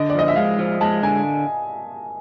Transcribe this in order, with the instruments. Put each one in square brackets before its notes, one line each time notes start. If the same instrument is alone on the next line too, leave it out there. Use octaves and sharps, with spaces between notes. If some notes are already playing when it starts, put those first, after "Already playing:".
Already playing: [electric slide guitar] D3 [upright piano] D#5
[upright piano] D5
[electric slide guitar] F3 [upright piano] D#5
[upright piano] E5
[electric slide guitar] G#3 [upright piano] F5
[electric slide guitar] F3
[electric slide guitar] G#3 [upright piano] A5
[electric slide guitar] D3 [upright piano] G#5